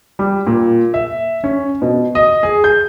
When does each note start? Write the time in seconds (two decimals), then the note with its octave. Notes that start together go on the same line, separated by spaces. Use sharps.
0.19 G3
0.47 A#2
0.94 E5
1.44 C#4
1.82 B2
2.15 D#5
2.43 G#4
2.64 G6